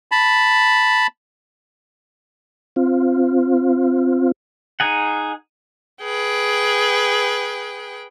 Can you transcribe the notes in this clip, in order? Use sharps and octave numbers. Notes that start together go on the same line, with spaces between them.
A5 B5
C4 F4
D#4 G#4 F#5
G#4 B4 G5